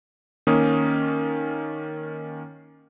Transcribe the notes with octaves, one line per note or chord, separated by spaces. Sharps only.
D#3 A#3 C#4 D#6